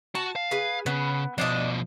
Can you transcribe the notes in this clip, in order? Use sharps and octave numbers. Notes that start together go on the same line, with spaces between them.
F#4 A5
F5
G#4 B4
C#3 B3
B2 F3 D4 D5 D#5